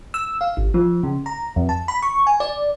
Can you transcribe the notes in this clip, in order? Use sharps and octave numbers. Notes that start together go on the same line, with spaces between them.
E6
F5
G#1
F3
C#3
A#5
F2
A5
B5
C#6
G#5
D5